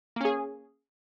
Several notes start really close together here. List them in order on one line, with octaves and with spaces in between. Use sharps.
A#3 C#4 G#4